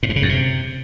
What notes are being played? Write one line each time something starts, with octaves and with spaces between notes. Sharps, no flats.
A2
G2
C#3
F#2
C3